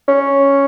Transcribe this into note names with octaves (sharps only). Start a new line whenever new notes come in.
C#4